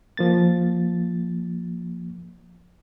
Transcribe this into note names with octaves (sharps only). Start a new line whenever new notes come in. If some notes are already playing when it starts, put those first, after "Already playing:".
F3 A#3 A6